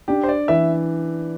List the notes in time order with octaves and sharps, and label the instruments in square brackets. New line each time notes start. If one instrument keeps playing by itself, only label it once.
[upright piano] D4 [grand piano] G4
[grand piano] C5
D5
[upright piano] E3 [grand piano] E5